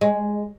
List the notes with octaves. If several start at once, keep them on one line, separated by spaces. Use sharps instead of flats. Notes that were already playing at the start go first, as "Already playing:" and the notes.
G#3